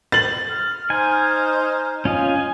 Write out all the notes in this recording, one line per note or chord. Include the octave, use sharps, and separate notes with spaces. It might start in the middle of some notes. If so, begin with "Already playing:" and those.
A6 F#7
F6
D#4 C5 G#5
C#4 F4 D#5 G#5